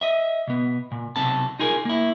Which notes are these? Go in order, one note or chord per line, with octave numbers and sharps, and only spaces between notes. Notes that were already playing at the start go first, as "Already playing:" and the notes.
D#5 E5
B2 B3
A#2
B1 C3 C4 A4 A5
D#4 F4 G#4 A#4
A#3 E4